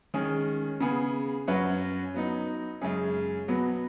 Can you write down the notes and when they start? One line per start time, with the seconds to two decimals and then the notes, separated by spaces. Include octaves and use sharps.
0.14 D#3 G#3 C#4 G#4
0.80 C#3 B3 G#4
1.47 F#2 F#3 C#4 F#4 B4
2.14 F#3 B3 D#4
2.81 F#2 C#3 G#3 C#4 G#4
3.48 B2 F#3 B3